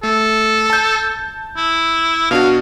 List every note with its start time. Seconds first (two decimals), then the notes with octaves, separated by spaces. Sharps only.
0.03 A3 A4
0.70 A5 G6
1.57 E4
2.31 B2 D4 F#4 F5